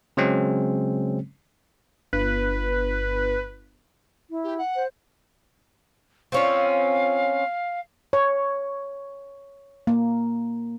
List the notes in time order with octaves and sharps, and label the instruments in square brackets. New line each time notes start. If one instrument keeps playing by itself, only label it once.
[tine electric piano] C#3 F#3 G#3 C4 C#4
[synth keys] G1 [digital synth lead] B4
[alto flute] E4
[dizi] G4
F#5
[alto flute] C5
[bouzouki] C4 C#4 F4 [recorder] F5
[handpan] C#5
A#3